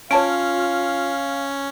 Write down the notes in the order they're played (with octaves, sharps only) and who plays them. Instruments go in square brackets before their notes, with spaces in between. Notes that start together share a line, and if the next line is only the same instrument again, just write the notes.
[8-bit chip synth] C#4 [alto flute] F4 [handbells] C#5 A5 D7 [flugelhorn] F5